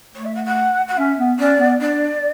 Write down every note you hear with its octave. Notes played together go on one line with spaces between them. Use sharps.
A3 C#5
E5
F#5
F#5
F#5
C#4 E5
B3
C#4 D5
B3
D4 D5